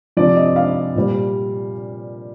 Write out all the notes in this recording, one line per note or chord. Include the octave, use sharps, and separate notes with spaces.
C3 F3 D5
D#5
F5
A#2 G3